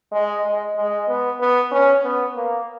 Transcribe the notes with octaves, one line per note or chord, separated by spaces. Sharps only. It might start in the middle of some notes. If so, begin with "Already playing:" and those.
G#3
G#3
G#3
B3
B3
C#4
B3
A#3